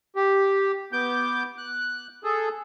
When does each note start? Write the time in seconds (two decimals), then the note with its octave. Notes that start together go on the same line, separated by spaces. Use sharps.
0.16 G4
0.93 B3 D6 G6
1.58 F#6
2.24 G#4 A4